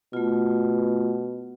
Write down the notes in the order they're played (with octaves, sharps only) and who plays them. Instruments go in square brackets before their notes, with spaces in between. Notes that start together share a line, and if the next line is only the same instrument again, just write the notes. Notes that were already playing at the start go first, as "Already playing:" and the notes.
[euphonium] B2 [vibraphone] A3 F4